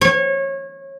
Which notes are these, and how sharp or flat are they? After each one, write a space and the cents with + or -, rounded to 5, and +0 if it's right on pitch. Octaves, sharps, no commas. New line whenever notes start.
C#5 -25